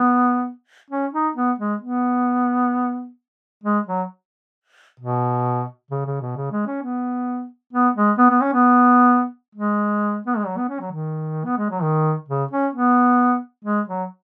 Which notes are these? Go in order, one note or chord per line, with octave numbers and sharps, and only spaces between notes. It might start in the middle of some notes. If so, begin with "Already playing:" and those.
Already playing: B3
C#4
D#4
B3
G#3
B3
G#3
F#3
B2
C#3
C#3
B2
C#3
G#3
C#4
B3
B3
G#3
B3
B3
C#4
B3
G#3
B3
G#3
F#3
B3
C#4
F#3
D#3
B3
G#3
F#3
D#3
C#3
C#4
B3
G#3
F#3